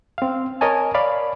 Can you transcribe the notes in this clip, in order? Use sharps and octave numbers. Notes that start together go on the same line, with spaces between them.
C4 F5
A#4 C#5 D#5 G#5 A5
C#5 D5 F5 B5